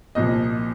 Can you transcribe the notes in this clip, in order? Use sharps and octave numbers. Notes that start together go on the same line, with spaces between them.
C2 A#2 F3 D#5